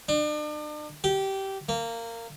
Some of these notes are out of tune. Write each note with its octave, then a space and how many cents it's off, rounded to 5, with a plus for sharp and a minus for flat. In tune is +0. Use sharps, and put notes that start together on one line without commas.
D4 +40
G4 -15
A#3 -20